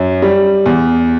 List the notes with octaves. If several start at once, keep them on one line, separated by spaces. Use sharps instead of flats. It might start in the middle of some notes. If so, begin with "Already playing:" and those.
Already playing: F#2
G3
E2